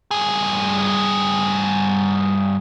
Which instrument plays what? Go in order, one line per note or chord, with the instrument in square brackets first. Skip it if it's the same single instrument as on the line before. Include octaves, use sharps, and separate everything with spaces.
[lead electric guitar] G2 G#4